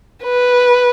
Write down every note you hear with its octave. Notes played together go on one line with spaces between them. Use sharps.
B4